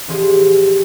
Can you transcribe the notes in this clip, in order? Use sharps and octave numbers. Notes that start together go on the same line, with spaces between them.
A1 F3 G4 G#4 C6 G#6